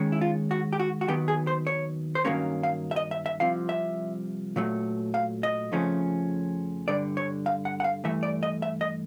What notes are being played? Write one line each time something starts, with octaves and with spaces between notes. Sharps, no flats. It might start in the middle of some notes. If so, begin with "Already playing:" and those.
Already playing: D#2 D#3 G#3 C#4
E4
F4
F#4
G4
F#4
F#4
D#2 D#3 F#3 B3 G4
G#4
C5
C#5
C5
G2 D#3 F#3 A#3 C#4 C#5
F5
E5
D#5
E5
E5
C2 C3 F3 F5
E5
A#2 F#3 A3
F5
D#5
F2 C#3 F3 A3 C#4
G2 D3 G3 D5
C#5
F5
F#5
F#5
F5
G2 E3 A3 E5
D5
D#5
E5
D#5